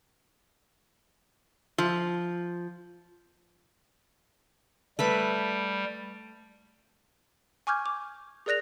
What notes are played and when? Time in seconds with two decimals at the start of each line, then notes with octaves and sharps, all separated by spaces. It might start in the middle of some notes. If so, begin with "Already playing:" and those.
1.78 F3
4.99 G3 A3 B4 B5
7.67 G#5 C#6 D6 F6 G6 G#6
7.86 D6
8.46 G#4 A#4 D5 F#6 A#6 F7